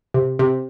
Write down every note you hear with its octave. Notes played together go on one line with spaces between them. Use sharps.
C3
C3